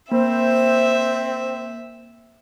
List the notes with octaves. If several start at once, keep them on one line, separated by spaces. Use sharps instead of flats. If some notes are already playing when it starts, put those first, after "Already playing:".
A#3 C4 C5 E5